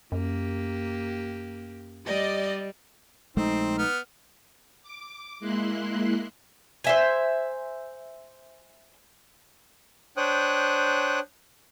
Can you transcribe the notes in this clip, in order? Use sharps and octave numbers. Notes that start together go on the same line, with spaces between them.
F#2 A#3 G4
G3 D5 D#5
A#1 G#3 A3 C4 D#4
B3 F6
D6
G#3 A#3 E4 C6 F#6
C5 E5 G#5
D4 C5 C#5 G5 D#6 F#6